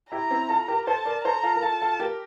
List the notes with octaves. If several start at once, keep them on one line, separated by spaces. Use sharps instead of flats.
E4 G4 A#5
C4 E4
F4 A4
G4 A#4
A4 C5 A5
A#4 D5
A4 C5 A#5
F4 A4
A#4
F4 A4 A5
F4 A4
G4 A#4